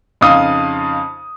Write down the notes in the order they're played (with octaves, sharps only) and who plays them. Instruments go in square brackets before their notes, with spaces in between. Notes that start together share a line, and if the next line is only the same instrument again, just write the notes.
[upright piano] F2 C#3 D#4 F5 D#6